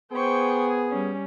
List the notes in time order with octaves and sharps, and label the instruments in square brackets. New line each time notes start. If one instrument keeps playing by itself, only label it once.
[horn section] B3 G#4 [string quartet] C5 G5 C#6
[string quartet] G3 C#4